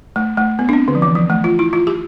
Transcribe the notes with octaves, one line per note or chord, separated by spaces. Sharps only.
A3
A3
B3
D4
C4
D3
F3
E3
F3
A3
F4
E4
F4
G4